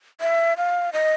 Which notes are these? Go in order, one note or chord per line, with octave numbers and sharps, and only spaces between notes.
E5
F5
D#5